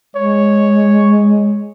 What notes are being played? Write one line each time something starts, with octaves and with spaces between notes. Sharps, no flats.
G#3 C#5